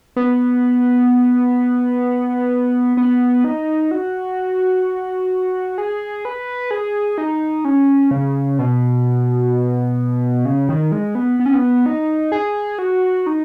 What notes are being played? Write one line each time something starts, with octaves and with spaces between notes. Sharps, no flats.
B3
B3
D#4
F#4
G#4
B4
G#4
D#4
C#4
C#3
B2
C#3
D#3
G#3
B3
B3
C#4
B3
D#4
G#4
F#4
D#4